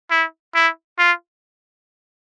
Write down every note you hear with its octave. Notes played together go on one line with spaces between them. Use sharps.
E4
E4
F4